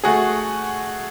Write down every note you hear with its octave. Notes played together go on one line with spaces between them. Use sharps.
A3 F#4 G#4